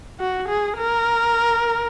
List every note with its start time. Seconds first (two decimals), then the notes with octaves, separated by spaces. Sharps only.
0.20 F#4
0.48 G#4
0.77 A#4